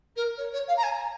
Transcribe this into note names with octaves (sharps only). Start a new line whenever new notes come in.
A#4
C#5
C#5
F5
A#5
G#5